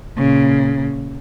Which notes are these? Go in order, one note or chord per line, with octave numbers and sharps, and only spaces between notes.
A#2 C#3